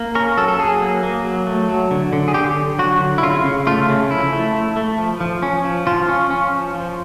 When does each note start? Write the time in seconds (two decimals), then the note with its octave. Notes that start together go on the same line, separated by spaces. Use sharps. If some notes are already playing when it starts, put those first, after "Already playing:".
Already playing: A#3
0.15 C#4 A#4
0.37 F#3 A4
0.48 A4
0.59 F#3 G#4
0.81 A#3
1.03 A#3
1.25 F#3
1.47 A3
1.69 F#3
1.91 D3
2.13 D3
2.28 G#4
2.34 D3 G4
2.57 D3
2.79 F#3 F#4
3.01 D3
3.18 E4
3.23 C#3 F4
3.45 C#3
3.67 A3 F4
3.89 C#3
4.10 F3 E4
4.32 A3
4.55 A3
4.77 A3
4.98 F3
5.21 F3
5.42 C#4
5.65 F3
5.87 F3 F4
6.09 C#4
6.31 C#4
6.52 F3
6.75 F3